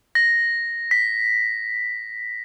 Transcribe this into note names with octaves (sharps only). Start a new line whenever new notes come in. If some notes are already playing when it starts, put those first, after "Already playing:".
A#6
B6